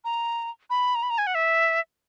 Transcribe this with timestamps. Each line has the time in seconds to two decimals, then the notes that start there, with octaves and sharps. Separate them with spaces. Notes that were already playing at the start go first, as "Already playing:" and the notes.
0.05 A#5
0.70 B5
0.95 A#5
1.03 B5
1.10 A#5
1.18 G#5
1.27 F#5
1.35 E5